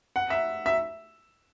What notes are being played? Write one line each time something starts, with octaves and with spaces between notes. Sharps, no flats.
F#5
E5
E5